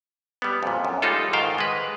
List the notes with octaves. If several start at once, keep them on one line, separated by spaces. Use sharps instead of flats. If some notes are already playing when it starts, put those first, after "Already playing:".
G3 B3
F2 A#2
F#2
G3 G#3 D#4 F4 A4
G#2 D#3 C5 F5 G5
G#3 B4